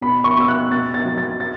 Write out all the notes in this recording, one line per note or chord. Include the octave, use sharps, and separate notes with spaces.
B2 B5
C#6
B2 E6
F#6
B2 A6
A6
F#3
A6
A6